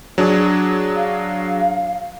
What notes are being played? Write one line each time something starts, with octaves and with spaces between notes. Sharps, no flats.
F#3 D4 G#4
F5